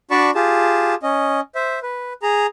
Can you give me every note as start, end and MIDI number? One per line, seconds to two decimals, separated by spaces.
0.11 0.31 62
0.11 0.31 66
0.11 0.31 74
0.11 0.31 81
0.11 0.31 83
0.11 0.31 85
0.35 0.95 65
0.35 0.95 67
0.35 0.95 68
0.35 0.95 81
1.03 1.40 61
1.03 1.40 75
1.55 1.79 72
1.55 1.79 76
1.83 2.13 71
2.22 2.46 68
2.22 2.46 82